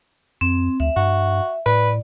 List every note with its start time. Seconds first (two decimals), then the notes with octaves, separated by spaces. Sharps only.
0.41 F2 C4
0.80 D2 E5
0.96 G2 F#4
1.66 A2 B4 D5